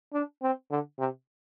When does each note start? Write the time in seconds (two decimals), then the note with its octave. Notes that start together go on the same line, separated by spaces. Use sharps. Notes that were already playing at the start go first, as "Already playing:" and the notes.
0.13 D4
0.43 C4
0.71 D3
0.99 C3